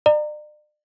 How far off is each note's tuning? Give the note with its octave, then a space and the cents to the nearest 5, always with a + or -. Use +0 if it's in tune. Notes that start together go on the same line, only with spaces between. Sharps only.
D5 +40 A#5 -15